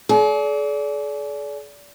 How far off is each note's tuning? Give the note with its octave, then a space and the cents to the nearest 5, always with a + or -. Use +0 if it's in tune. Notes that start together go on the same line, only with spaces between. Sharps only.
G#4 +45 D5 -30